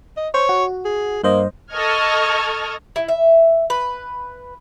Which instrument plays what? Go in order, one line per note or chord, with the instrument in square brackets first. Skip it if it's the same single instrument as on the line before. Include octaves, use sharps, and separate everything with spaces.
[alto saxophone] D#5
[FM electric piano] C5 [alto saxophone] C#5
[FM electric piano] F#4
[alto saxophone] G#4
[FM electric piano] G2 C5 D#5 [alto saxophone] A#3
[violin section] A4 D#5 C#6 F6 G#6
[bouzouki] E4
E5
B4